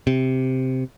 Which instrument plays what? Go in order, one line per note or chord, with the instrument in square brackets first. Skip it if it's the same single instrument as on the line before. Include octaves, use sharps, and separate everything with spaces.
[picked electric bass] C3